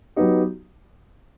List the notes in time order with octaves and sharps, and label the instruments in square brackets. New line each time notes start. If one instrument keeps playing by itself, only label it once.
[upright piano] F#3 B3 D#4 G4